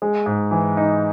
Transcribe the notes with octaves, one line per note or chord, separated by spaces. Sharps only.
G#3
G#2
E3
D#4